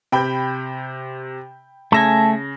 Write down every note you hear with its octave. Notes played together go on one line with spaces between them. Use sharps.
C3 G5 B5 G6
C#3 A3 E5 G#5 A5 A#6